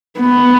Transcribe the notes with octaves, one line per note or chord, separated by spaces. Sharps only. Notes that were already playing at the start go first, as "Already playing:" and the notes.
B3